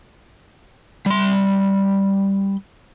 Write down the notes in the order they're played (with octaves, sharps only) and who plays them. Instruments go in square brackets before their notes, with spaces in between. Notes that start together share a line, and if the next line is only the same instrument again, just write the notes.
[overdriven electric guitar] G3 C6